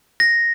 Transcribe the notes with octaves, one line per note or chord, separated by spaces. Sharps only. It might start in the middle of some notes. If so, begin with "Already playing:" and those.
A#6